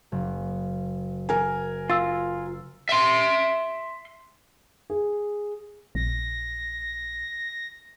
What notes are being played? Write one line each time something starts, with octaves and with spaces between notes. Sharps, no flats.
F#1
A#4 G#5
F4 E6 A6
E5 C6
G#4
A#1 A#6